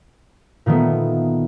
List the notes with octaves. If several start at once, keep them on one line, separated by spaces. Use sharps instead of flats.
A#2 D#3 A3 B3